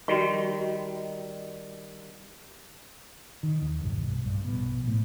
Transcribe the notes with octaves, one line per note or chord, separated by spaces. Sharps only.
D#3 G3 F#4 D#5 C#6
D#3
D#2
B1 G2 G3
B1 G2
A#1 B2
A2